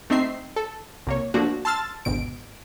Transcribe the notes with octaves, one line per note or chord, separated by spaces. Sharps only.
A3 C4 D#4 E5 C7
A4
C2 A#3 C#5
F3 A3 A#3 D4 F#4
A5 C6 E6 F6 A6
G#1 D2 B2 D7